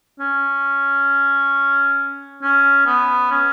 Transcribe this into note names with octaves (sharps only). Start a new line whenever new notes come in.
C#4
C#4
B3
C#4